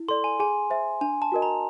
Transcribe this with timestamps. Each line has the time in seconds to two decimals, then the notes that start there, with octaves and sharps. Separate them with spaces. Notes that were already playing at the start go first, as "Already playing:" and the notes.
Already playing: E4
0.08 A4 D5 C6
0.24 G#5
0.40 G#4 G#5
0.70 C5 E5
1.01 D4 G#5
1.22 A5
1.32 F#4 A#4 D#5
1.42 A#5